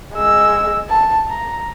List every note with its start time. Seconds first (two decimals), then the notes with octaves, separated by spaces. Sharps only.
0.14 G#3 E6
0.89 A5
1.29 A#5